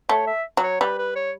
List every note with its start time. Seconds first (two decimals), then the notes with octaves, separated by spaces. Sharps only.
0.09 A3 C#5
0.27 E5
0.57 F#3
0.63 C#5
0.80 G3 B4
0.98 B4
1.15 C#5